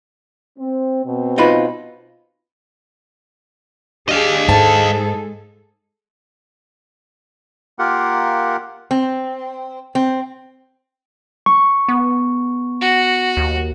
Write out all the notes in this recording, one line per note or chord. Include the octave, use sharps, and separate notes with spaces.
C4
B2 C4
D#4 F4 B4
D4 G4 G#4 D#5 F5
G#2 G#3 G#4 A4 A5
A#3 F4 G4 A#4 F#5
C4
C4
C#6
B3
F#4
D#2